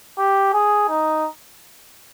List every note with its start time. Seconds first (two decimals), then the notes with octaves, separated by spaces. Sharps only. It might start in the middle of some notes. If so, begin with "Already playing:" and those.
0.18 G4
0.53 G#4
0.89 D#4